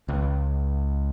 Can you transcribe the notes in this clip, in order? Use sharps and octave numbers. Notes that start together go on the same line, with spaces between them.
C#2